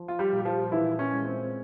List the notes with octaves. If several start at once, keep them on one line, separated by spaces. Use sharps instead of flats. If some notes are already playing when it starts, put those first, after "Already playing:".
Already playing: F3
F4
G3 G4
A#2
G4
F3 F4
A#2 E3 E4
C#4
G#3
C4